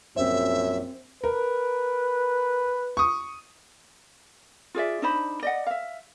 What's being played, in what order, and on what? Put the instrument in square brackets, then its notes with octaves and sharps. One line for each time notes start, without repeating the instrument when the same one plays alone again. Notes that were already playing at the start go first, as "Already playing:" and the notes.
[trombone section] A#1 F#2 [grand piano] C4 C5 [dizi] E5
[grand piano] A#4 [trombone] B4
[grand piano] C#6 D#6
[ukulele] F4 G#4 D5 E5
D4 D#4 C5 B5
D5 D#5 F#5
E5 F5